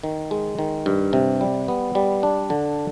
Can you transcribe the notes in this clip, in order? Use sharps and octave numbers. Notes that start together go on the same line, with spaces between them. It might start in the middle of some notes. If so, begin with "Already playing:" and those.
D#3
G#3
D#3
G2
C3
G3
B3
G3
D4
D3